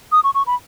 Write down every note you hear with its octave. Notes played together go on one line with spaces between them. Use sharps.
D#6
C#6
C#6
B5